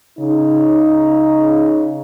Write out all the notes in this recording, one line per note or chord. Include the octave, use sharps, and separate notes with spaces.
C#3 D#4